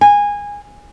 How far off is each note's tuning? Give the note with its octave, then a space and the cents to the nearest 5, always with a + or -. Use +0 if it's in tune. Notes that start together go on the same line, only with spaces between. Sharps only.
G#5 -20